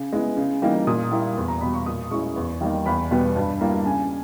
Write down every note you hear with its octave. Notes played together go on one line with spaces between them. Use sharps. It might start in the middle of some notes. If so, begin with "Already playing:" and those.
Already playing: C#3
G#3 B3 E4
C#3
E3 G3 A#3 D#4
A#2 D#6
G3 A#3 E4
E2
A#5
B2 G3 B5
C#6
A#2 D#6
G#3 C#4 E4 C#6
E2
D#3 G3 A#3 D#4
E2 B5
B2 G3 B3
G2
G3 A#3 E4
C#3 G#5